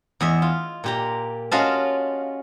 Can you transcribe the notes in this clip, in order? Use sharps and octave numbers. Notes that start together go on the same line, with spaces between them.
E2 D#5 E5
F4
A#2 G4 A#5
C#4 F4 F#4 D#5 F5 A5